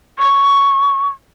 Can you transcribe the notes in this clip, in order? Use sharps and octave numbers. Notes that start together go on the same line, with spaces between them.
C#6